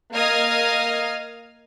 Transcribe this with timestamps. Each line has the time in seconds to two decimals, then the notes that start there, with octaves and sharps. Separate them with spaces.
0.13 A#3 D#5 F5 D#6 F6 G#6